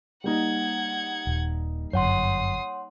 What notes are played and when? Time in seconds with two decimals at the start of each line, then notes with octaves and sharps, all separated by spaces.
0.24 G3 A#3 D#4 F#5 G#6
1.27 D#1
1.93 G1 F#2 C#5 F#5 C6 D#6 C7